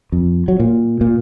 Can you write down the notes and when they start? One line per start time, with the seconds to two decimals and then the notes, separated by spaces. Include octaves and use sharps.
0.12 F2
0.48 F#3
0.60 A#2
1.01 A#2